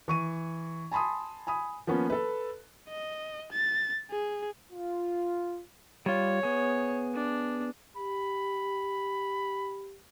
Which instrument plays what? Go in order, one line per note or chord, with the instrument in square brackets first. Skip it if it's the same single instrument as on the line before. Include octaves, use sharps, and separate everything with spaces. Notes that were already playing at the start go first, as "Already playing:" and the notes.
[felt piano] E3 C#6 D#7
G#5 A5 B5 C6 D#6
G#5 B5 D#6
F3 A#3 B3 C#4
A4 B4
[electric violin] D#5
A6
G#4
[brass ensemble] F4
[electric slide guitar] G3 F4 [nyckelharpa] C#5
[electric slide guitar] B3 G#4
[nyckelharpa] D4
[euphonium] G4 [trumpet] B5